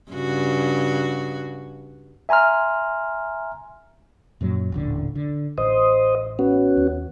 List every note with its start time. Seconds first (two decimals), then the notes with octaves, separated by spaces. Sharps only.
0.11 G2 C#3 F#4
2.29 E5 G#5 A#5 C6 F6
4.41 F#2 A#2 F#3
4.72 D#1 A1 D3
5.15 D3
5.58 A1 C5 D#5
6.39 B3 C#4 F#4
6.77 D#2